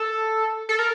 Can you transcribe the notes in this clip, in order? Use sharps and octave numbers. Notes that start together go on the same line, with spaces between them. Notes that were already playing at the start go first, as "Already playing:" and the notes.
Already playing: A4
A4
A#4